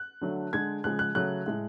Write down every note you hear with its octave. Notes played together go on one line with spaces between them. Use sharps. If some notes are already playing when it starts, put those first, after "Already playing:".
Already playing: F#6
D3 F#3 A3
D3 G#3 G#6
C#3 F3 G#3 F#6
F#6
C#3 F#3 A3 F#6
A2 G#3